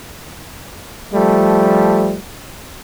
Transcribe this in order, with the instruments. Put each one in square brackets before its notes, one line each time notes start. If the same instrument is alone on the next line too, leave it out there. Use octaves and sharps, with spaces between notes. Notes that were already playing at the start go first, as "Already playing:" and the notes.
[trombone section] F3 G3 A3